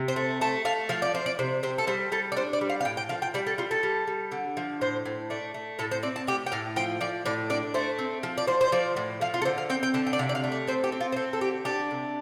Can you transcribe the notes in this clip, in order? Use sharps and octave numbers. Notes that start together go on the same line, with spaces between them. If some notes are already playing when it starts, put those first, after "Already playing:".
Already playing: C3
C5
A3
A3 A5
A3 F5
F3 F5
D5
F3 C5
D5
C3 C5
C3 C5
A4
G3 C5
G3 A4
D5
D4 C5
D5
G3
F5
F5
A2 G5
G5
F3 F5
G5
G3 D5
A4
G3 F4
A4
G3
G3
D3
F3
A2 C5
A2
A3 D5
A3
A2 A4
C5
C4 D5
A5
A2 G4
G5
A2 F5
F3 G5
F3 D5
A2 D5
D4 D5
A3 C5
C4
F3
D5
F3 C5
C5
F3 D5
A2
F3 F5
F4
A4
D3 C5
F5
C4 G5
G5
D3 A5
G5
D5
C3 F5
D5
F5
A3
D5
C4 C5
G4
C4
F4
C5
C4 A4
A4
D3 G4
D4 G4
C3